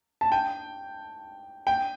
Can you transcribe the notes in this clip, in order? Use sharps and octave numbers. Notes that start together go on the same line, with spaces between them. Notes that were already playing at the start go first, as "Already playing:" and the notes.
A5
G5
G5